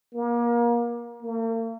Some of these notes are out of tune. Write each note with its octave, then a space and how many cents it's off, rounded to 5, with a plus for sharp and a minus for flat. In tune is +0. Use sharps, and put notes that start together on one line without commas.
A#3 +30
A#3 -45